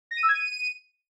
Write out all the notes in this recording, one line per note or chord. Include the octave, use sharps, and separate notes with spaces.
A#6
D#7
E6
G#6
D#7